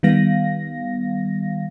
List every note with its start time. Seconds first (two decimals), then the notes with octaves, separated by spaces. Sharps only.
0.03 D#3 G3 B3 F5 A#6